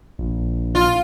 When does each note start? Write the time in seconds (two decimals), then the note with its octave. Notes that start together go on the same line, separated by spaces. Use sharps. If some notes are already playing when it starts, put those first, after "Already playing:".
0.19 A#1
0.75 F4